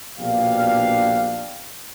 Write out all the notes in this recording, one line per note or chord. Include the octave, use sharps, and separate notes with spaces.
A#1 B2 D4 G4 F5